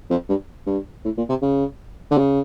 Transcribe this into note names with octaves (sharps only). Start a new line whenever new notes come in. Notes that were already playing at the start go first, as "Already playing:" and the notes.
F2
G2
G2
A2
A#2
C3
C#3
D3
C#3